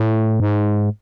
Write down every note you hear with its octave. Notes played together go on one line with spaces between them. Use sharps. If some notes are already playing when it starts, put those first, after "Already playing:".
Already playing: A2
G#2